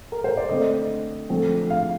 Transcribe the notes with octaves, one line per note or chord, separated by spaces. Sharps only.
A#4
C5
D5
D3 A3 C4 D#5
D3 F3 A3 C4
F5